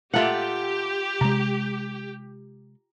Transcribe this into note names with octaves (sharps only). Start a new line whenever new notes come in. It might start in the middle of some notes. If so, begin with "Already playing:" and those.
A#2 A3 F4 G4 E5 F#5
C3 G#3 A#5